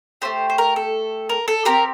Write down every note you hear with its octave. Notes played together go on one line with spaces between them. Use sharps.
A3 D4 G4 C5
C5
A#4
A4
A#4
A4
C4 G4 A#4